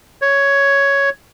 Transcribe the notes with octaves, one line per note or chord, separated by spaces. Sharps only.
C#5